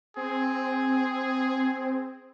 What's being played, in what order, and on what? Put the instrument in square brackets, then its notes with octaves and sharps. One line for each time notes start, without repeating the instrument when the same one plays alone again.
[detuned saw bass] C4 [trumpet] G#4